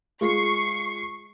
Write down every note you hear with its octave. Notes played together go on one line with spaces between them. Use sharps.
G#3 F4 G#4 C#6 C7